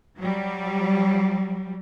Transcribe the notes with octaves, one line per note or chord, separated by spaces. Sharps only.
F#3 G3